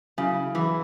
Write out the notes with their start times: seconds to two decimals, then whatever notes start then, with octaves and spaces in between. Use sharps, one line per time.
0.18 C#3 F#3 E4 G#4
0.55 E3 F#3 E4 G#4